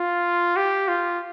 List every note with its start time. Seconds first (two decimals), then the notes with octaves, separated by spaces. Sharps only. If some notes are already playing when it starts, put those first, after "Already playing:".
Already playing: F4
0.56 G4
0.88 F4